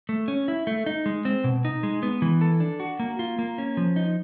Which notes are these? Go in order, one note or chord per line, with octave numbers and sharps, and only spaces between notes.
A3
C#4
E4
A3
D#4
G#3
C4
B2
D#4
G#3
B3
E3
A4
D4
F#4
A#3
F4
A#3
C#4
F3
D#4